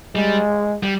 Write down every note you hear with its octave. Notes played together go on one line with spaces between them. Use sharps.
G3 G#3
G3